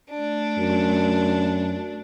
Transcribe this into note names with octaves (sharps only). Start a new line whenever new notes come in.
A3 D4
F#2